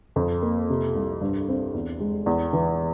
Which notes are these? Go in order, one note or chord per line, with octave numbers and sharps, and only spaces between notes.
F2
A#3
C3
C2
G2
C4
E2
G#3
E2
E3